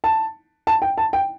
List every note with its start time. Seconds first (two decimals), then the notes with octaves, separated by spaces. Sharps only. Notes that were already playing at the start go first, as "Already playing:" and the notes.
0.04 A5
0.67 A5
0.82 G5
0.98 A5
1.13 G5